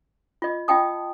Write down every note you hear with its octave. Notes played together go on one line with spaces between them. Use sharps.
F4 D#5
F4 D#5 G5 A5 D#6